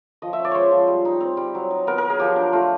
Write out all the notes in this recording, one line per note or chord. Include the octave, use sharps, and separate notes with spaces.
F3 D#5
E5
C#4
D5
G#3 C5 C#5
F3
G3
D#4
C4
G3
F#3
D#4
B3 A#4
F#3 A#4
G#4
F3 G4
D4
A3 F4